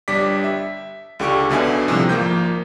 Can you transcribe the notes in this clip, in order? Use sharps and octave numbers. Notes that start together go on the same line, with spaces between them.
G1 G3 D4 D6 B6
E5
C#2 D3 G4 C#6 D7
B1 B2 D3 E5 G#5
A2 C3 F3 G3 G#3
G#1 F3 A#3 G6